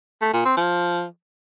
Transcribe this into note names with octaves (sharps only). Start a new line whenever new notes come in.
A3
A#2
C4
F3